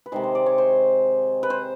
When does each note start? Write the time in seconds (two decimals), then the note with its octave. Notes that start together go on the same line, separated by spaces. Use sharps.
0.06 B4
0.12 C3 D#3 G#3 C5
0.24 C5
0.35 D5
0.46 C#5
0.58 C5
1.43 B4
1.50 C5